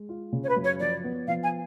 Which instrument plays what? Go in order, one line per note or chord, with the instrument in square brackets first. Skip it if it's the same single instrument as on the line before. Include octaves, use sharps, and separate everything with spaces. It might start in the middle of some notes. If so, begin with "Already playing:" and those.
Already playing: [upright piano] G#3
F4
C#3
[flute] C#5
B4
[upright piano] F#2
[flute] C#5
[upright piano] F3 [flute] D5
[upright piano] B3
[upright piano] F3 [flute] F5
[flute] G#5